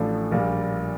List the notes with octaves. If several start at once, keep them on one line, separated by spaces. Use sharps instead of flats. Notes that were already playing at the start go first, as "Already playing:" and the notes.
Already playing: A1 A2 F3 A3 D4
A#1 A#2 G3